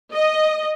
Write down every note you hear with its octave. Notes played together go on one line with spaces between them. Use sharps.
D#5